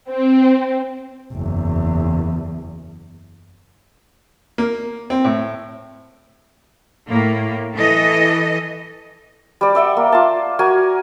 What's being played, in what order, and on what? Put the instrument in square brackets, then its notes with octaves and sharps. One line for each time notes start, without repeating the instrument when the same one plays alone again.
[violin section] C4
[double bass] F#1 E2
[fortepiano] A#3
C4
A2
[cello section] A2 A#3
E3 A4 D#5
[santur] G3 D5
D5 E5 F#5 G5
A#3
F4 A5
F#4 A#4 G#5